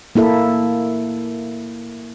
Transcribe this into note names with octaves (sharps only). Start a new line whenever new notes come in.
A#3 E4 A4 E5